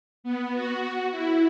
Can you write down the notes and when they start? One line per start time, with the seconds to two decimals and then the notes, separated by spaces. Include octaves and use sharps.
0.24 B3
0.54 F#4
1.12 E4